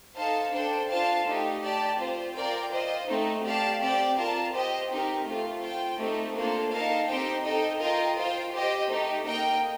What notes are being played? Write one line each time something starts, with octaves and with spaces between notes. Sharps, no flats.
D#4 A4 C5 F5 A5
D4 A4 C5 G5
D4 F4 C5 F5 A5
A3 D#4 G4
G4 D5 A5
C4 F4 C5
F4 A#4 D5 G5
F4 C5 D#5
A3 C4 D#4
G4 D5 F5 A5
C4 G4 D5 G5
F4 A#4 F5 A5
G4 C5 D#5 G5
C4 D#4 G4 A#4
A3 C4 F4
F4 C5 G5
A3 C4 D#4 G4
A#3 D4 F4 A4 C5
D#4 A#4 F5 A5
C4 D#4 G4 C5 G5
D#4 A4 D#5 G5
F4 A#4 D#5 G5
F4 C5 G5
G4 C5 D#5 G5
A3 D#4 G4
A#3 D#4 A#4 D#5 G5